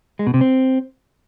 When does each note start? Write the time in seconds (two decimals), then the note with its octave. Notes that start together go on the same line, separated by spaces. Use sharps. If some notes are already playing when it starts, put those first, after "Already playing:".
0.19 G#3
0.27 B2
0.34 C3
0.41 C4